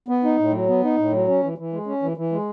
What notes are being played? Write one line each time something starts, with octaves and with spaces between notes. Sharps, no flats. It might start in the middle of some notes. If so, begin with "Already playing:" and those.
B3
D#4
A2
F#3
B3
D#4
A2
F#3
C#4
E3
E3
G#3
C#4
E3
E3
G#3